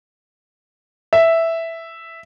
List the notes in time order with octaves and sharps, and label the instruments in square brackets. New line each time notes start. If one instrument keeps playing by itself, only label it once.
[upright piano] E5